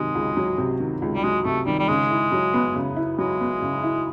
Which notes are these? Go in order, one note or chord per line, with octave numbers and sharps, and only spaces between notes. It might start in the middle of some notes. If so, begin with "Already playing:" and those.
Already playing: C3 D#3 F#3 G#3
C#2
F#3
C3
D#3
C#2
G3
F#3 G#3
C3 A3
D#3 G3
G3
C#3 G#3
E4
F#3
B3
C#3
E4
F#3 G#3
B3
C#3
E4